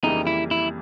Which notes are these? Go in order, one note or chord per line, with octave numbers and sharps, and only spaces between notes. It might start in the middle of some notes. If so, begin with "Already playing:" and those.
F2 C#3 E3 G3 A#3 D#4
E4
E4